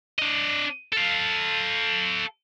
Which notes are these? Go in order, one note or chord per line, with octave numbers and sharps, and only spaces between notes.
D4 D#5
A4 F5